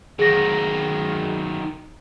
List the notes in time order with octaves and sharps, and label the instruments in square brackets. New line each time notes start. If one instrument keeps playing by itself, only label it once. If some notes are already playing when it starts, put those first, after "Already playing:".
[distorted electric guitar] D#3 F#3 [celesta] G#4 A#6